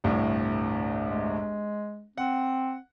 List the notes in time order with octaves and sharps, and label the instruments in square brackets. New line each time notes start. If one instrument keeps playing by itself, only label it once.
[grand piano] G1 C2 A2
[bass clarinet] G#3
[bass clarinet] C4 [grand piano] F#5